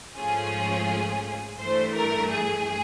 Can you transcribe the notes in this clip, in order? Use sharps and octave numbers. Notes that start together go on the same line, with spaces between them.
G#2 F3 A3 C#4 F4 G#4
G2 E3 A3 C5
A#4
G#4